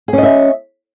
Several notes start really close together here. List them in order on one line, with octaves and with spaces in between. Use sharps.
G#4 C#4 D#5 E5